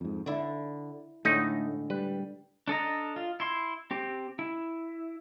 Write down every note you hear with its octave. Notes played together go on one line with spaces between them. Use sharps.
F2 G#2
D3 E4 D5
A2 D3 G#3 A3 D#4
G3 B4
D4 A4 D#5 A#5
F4
E4 C6
C4 G4
E4